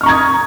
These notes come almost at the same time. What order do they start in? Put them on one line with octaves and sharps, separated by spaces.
F6 C#6 A#5 G#6 D#6